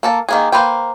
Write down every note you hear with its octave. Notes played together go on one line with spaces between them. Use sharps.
A#3 A4 A5
D#3 A#3 G#4
A#3 B4 C5 G5